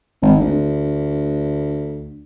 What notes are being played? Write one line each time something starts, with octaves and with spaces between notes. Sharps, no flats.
G#1
D2